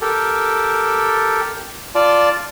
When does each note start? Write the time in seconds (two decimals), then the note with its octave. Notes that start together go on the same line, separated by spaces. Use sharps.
0.01 G4 A4 A#4
1.95 F4 D5 A5